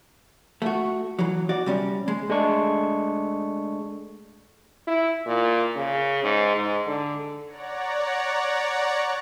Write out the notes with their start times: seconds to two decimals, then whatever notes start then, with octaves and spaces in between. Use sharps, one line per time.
0.62 A3 F#4
1.19 E3 F#3
1.49 F#4 D5
1.66 C3 G3 C#4
2.08 G#3
2.30 G#3 A3 D4 C#6
4.87 E4
5.26 A#2
5.76 C#3
6.23 G#2
6.56 G#2
6.86 D3
7.45 C#5 D5 F#5 A#5